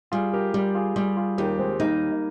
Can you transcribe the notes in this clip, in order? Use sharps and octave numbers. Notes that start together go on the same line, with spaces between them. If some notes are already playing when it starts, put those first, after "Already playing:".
G3 F4 G#4
G4 A#4
G3 G4 A#4
F4 G#4
G3 F4 G#4
F4 G#4
D#2 D#4 G4
G#3 C4
G3 A#3 D#4